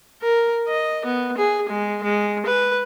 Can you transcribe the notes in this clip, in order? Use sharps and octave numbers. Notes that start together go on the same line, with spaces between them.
A#4
D#5
B3
G#4
G#3
G#3
B4